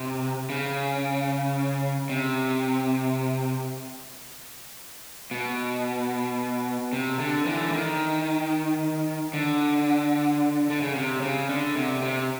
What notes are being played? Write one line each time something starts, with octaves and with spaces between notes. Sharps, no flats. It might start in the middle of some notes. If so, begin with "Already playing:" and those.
Already playing: C3
C#3
C3
B2
C3
D3
D3 E3
D#3
D3
D3
C#3
C3
C#3
D3
C3
C3